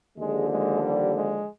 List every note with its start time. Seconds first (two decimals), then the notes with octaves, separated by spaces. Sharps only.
0.18 D#2 D3 F3 G#3
0.51 G#3
0.83 G3
1.15 G#3